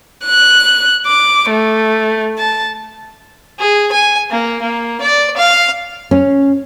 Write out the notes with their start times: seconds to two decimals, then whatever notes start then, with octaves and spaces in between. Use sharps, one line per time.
0.25 F#6
1.07 D6
1.50 A3
2.39 A5
3.59 G#4
3.91 G#5
4.31 A#3
4.61 A#3
5.01 D5
5.36 F5
6.11 C#4